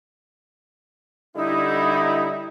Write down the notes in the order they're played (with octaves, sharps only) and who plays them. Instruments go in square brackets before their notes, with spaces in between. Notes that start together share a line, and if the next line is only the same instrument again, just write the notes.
[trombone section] D3 G3 E4 [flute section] D#4